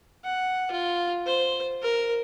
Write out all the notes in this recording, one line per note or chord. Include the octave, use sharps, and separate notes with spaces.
F#5
F4
C5
A#4